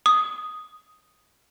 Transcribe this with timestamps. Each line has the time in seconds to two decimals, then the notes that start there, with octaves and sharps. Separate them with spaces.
0.06 D#6